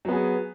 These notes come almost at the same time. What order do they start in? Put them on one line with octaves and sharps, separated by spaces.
F#3 B3 G#4